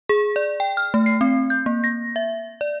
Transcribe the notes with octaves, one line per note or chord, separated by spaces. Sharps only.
G#4
D5
G5
F6
A3
C7
C4
G6
A#3
A#6
E5
D5